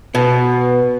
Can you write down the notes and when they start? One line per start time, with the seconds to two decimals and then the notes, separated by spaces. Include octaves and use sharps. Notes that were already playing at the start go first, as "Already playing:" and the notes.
0.15 B2 B3